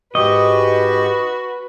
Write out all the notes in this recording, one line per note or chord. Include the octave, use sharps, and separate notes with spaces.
G#2 F#4 G4 B4 D#5 C#6